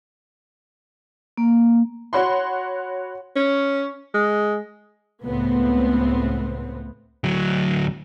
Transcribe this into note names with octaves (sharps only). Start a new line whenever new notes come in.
A#3
F#4 C#5 F#5 B5 C6
C#4
G#3
C#2 A2 B3 C4
D2 F#3